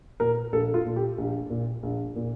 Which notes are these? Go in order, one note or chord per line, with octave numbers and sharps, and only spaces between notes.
A#2 A#4
A#1 A4
F4
A#2
G4
A#1
A#2
A#1
A#2